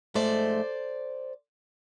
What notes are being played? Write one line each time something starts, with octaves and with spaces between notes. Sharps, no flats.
G#2 F3 A3 C5 D5